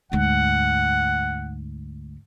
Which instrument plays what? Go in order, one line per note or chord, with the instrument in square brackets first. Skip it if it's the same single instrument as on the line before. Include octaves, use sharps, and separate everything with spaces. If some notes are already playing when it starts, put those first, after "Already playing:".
[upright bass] D2 G#2 [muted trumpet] F#5